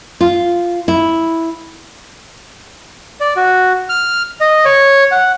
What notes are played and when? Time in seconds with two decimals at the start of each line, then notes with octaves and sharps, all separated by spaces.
0.21 F4
0.88 E4
3.21 D5
3.36 F#4
3.89 F6
4.41 D#5
4.65 C#5
5.11 F#5